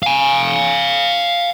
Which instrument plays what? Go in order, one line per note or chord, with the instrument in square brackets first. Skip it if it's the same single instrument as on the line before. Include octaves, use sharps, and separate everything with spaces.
[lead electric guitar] F5 G#5